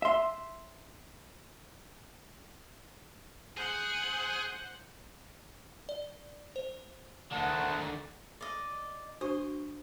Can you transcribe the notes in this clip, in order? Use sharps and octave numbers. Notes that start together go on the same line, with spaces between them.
E5 C6
G#4 C5 F#5
D5
C5
D2 D3 D#3 F#5 A5
D5 D#5
D4 F#4 C5 C#6 D#6